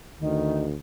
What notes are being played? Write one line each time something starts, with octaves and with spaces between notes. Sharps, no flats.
D2 D#3